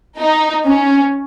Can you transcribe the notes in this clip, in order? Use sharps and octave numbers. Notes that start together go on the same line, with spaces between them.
D#4
C#4